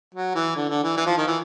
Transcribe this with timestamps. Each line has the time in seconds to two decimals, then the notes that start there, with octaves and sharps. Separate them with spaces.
0.14 F#3
0.35 E3
0.56 D3
0.69 D3
0.83 E3
0.97 E3
1.06 F3
1.17 D#3
1.27 E3